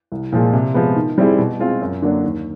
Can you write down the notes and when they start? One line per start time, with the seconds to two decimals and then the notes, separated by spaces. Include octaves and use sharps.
0.12 C2
0.32 A#2 F3 G#3
0.53 C3
0.74 F3 G#3 B3
0.96 D#3
1.18 G3 C4 E4 G#4
1.38 B2
1.59 G#3 C4 F4 G#4
1.81 F#2
2.02 D3 F#3 A#3 D4
2.24 D#2